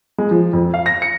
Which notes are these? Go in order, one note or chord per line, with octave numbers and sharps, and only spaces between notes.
G#3
F3
F2
F5
A#6
C#7